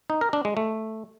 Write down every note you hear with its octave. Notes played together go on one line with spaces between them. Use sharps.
D#4
A#4
D4
G#3
A3